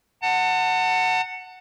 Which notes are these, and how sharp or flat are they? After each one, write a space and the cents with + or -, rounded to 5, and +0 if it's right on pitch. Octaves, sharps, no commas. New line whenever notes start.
F#5 +0 A5 +35